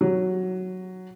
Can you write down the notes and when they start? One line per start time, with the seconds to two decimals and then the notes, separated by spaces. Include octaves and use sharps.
0.01 F#3